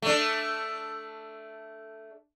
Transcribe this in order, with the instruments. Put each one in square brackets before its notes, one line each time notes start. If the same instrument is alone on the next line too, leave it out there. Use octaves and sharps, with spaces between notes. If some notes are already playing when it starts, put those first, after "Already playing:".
[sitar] A3 D4